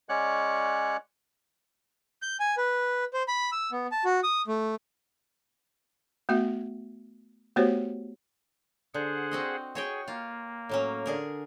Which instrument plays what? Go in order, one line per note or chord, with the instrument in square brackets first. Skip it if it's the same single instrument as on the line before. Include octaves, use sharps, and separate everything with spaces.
[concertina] G#3 C#4 C#5 D5 F#5 F#6
[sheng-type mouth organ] G6
G#5
B4
C5
B5
E6
B3
A5
F#4
D#6
A3
[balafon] A3 B3 F#4 E5
A3 B3 F#4 G4 C5 C#5
[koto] D3 [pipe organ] G#4 C5 F#5
[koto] C4 F#4 D#5
[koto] F#4 C#5 G5 [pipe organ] G#4
[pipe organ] A#3 [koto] F4
[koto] A2 F#3 C#4
D3 G#4 A#4